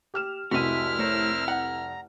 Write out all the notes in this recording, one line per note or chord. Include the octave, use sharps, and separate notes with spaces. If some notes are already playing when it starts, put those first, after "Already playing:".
G4 F6 E7
F1 C2 G#3 E4 F#4 E5 F6 D#7
A3 A#4 C5 C#5 E6
F#5 A#5